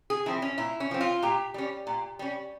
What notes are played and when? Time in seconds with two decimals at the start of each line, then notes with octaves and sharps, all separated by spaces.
0.10 G#4
0.26 F3 C4 E4
0.42 C#4
0.58 A#2 E4
0.80 C#4
0.91 F3 C4
1.01 F4
1.22 A#2 G4
1.54 G3 C#4
1.87 A#2
2.19 G3 C#4